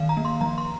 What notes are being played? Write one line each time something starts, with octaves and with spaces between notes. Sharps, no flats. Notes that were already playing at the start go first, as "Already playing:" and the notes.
Already playing: D#3 F5
A#5
A#3
C6
F3 A#5
C6